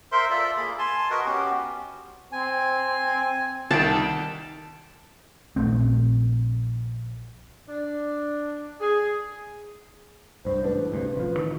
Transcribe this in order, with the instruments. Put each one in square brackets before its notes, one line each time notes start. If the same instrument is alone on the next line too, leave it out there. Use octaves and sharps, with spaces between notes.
[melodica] A#4 C5 E5 C6
F4 A4 D5 E5
A#3 G#4 B5
G#5 A5 C6
F#4 A#4 B4 D#5
B3 C#4 F#4 G4
[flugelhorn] C4 [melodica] G#5
[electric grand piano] C2 D#3 D7 [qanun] A5
[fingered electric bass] A#1 A3 C4
[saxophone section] D4
G#4
[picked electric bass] C2 G2 [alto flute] C5
[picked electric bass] A1 G#2 D4 [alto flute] B4
[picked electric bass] D2 G2 C3
A1 F3
D#3